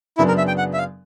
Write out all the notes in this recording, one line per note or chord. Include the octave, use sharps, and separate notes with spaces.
F#2 C#3 F#3 B3 D4 E4
A#4
E5
G5
F#5
E5
F5